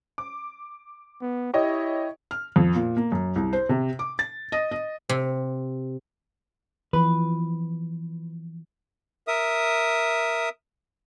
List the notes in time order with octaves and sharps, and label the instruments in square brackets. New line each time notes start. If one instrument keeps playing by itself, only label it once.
[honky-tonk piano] D6
[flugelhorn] B3
[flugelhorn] E4 [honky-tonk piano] G4 C#5 D#5
[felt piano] F6
F2
A#2
A#3
F#2
C2
C5
C3
D6
A6
D#5
D#5
[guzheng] C3
[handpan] E3 F3 [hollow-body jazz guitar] B4
[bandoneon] A#4 E5 D#6